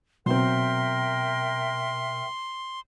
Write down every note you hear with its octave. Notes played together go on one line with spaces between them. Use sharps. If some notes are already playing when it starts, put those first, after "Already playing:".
B2 F#3 C4 A#4 E5 G5 C6